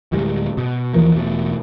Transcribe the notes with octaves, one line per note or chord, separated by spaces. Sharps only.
D1 A2 G3 G#3
B2
D#2 E3 F3 A#3
E1 B2 A3